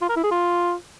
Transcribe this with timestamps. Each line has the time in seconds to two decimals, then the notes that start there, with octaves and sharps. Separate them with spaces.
0.02 F4
0.09 A#4
0.17 E4
0.24 G#4
0.31 F4